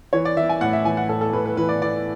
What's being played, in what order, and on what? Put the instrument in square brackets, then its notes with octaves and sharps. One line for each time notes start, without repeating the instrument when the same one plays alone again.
[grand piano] E3 C#5
D5
E3 E5
G#5
A2 F#5
E5
E3 G#5
F#5
A2 A4
A4
A2 B4
B4
E3 B4
D5
E3 D5